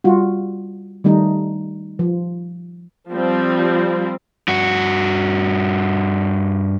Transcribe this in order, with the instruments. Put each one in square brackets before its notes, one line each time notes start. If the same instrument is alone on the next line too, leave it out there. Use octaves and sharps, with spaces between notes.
[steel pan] G3 F4 F#4
D#3 G3 A3 D#4
F3
[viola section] F3 G3 C4
[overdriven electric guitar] G2 F#4